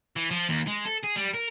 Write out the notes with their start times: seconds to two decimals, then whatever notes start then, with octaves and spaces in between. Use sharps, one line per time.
0.16 E3
0.31 F3
0.49 D#2
0.67 G#3
0.86 A4
1.04 G#4
1.17 G3
1.34 A#4